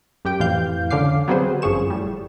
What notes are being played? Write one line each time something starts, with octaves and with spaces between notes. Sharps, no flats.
F#2 G4 G5 D7
F2 A2 E3 F5 G6
C#2 D3 C#4 F5 D6 C7
F#3 G3 B3 C4 G#4 C5
G1 F#2 F3 G#4 C#6 E7
A2 G3